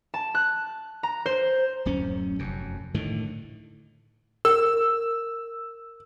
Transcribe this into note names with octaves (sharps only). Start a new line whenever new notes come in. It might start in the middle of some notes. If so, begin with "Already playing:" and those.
A5
F#6
A#5
C5
D1 F#2 C#4
F1 F#2
A2 D3 D#3
A#4 E6